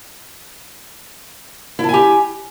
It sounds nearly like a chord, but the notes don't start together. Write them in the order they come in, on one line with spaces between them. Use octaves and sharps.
E4 A5 G#5 G4